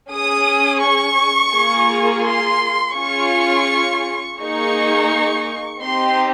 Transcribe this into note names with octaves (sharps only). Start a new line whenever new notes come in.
C#4 G#4 D#6
C#6
A#3 F4 G#4
C6
C#4 F4 G#4 C#6
A#3 D#4 G#4 C#6
C4 D#4 G4 C6